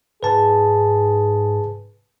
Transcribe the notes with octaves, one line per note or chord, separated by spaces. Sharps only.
G#2 G#4 B4 A5